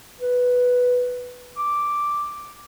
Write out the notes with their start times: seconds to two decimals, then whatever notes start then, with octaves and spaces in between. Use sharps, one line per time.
0.21 B4
1.57 D6